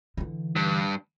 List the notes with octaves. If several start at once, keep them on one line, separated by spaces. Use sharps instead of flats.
D3 E3
G2